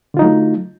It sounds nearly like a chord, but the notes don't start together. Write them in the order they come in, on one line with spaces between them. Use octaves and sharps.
D3 F4 D#4 F#3 A3